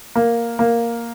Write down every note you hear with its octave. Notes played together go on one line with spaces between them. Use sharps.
A#3
A#3